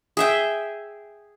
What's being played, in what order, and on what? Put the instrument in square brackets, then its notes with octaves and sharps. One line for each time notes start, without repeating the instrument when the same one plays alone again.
[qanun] G#4 E5 G5